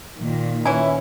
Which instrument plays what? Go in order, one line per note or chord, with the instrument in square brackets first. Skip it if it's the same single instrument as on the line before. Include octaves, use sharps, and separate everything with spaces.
[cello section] A#2 D#3
[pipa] E3 E4 [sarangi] C#4 [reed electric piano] C#5 G#5